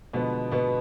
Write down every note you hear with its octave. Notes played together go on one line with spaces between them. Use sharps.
B2 D3 F3 G#3 B3
B2 B3